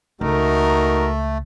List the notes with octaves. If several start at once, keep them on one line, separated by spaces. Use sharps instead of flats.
C#2 A3 D#4 F#4 A#4